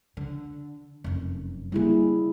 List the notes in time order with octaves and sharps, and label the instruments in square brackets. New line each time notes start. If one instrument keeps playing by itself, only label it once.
[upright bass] D3
F1 F#2
[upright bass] D3 A#3 [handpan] G3 E4 G#4